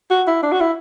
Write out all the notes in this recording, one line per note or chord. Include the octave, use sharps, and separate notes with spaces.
F#4
E4
D4
F#4
E4